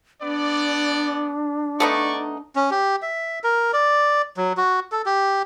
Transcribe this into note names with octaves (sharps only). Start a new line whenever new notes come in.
B3 D4 D5
A3 B3 D#4 D5 C#6
C#4
G4
E5
A#4
D5
F#3
F#4
A4
G4